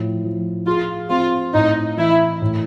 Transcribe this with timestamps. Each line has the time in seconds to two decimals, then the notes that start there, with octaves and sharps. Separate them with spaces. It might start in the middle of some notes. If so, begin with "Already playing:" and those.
Already playing: A2 F3
0.24 F3
0.66 F4 G#4
1.10 C4 F4
1.54 A2 D#4
1.97 E3 E4
2.42 A2